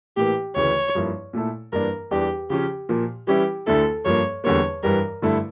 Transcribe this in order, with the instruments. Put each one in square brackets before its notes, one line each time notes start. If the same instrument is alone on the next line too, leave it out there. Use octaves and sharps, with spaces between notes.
[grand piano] A2 E3 A#3 [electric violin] G4
[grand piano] D2 C#3 E3 [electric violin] C#5
[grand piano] G2 F3 A#3 E4
A#2 A3 E4 A4
[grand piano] G2 E3 A#3 D4 [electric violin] A#4
[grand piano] E2 E3 G3 D4 [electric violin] G4
[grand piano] C#3 F3 C#4 [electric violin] G4
[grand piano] A#2 F3 A#3
[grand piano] E3 G3 C#4 E4 [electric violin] G4
[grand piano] D2 D3 A3 E4 [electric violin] A4
[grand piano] G2 F3 A#3 [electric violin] C#5
[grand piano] E2 D3 G3 A#3 [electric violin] C#5
[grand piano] G2 E3 G3 [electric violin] A#4
[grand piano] G2 D3 A3 E4 A4